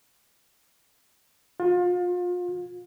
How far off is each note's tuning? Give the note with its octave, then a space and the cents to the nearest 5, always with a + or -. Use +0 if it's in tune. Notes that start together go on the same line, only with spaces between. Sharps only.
F4 +35